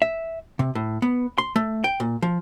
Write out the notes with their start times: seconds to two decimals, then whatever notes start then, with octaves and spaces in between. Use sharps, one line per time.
0.02 E5
0.59 C3
0.75 A2
1.02 B3
1.38 C6
1.56 A3
1.84 G5
2.00 A#2
2.22 F3